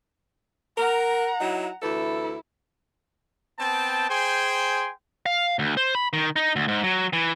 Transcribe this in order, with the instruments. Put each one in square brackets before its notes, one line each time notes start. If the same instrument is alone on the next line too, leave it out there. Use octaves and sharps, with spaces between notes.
[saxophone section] A#4 [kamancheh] F#5 A#5
[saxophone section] F#3 D#4 E4
[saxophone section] D2 E3 A4 [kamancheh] E4
[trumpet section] B3 C4 G5 A5
G#4 C5 G5 G#5 C6
[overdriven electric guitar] F5
D2
C5
B5
D#3
D#4
D2
G#2
F#3
E3